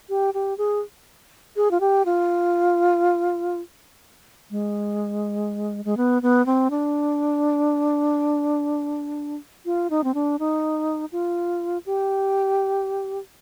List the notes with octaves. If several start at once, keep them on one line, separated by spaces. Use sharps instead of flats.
G4
G4
G#4
G#4
F4
G4
F4
G#3
G#3
B3
B3
C4
D4
F4
D#4
C4
D4
D#4
F4
G4